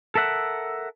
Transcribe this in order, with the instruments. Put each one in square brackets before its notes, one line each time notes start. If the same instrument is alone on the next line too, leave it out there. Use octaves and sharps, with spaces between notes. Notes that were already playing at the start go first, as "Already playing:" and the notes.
[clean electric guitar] A4 A#4 E5 F#5